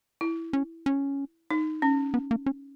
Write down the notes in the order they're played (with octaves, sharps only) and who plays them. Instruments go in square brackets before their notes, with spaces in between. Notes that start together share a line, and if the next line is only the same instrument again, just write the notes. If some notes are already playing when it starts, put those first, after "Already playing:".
[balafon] E4
[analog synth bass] C#4
C#4
[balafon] D#4
C#4
[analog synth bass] B3
A#3
C#4